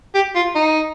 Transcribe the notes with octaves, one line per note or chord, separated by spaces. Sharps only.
G4
F4
D#4